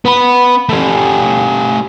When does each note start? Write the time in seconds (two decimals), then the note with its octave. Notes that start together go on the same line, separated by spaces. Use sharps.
0.05 B3 B5
0.69 A3 G4